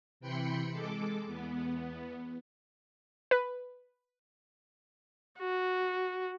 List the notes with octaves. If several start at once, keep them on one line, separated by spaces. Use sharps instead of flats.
C3 E3 G5 B5 C6 C#7
G#3 A4 D6
E2 B3
B4
F#4